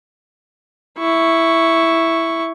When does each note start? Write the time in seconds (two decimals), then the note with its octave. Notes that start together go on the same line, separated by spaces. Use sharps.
0.99 E4 C#6